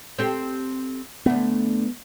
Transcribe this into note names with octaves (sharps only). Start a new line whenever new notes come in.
C4 G4 A4
D2 A3 B3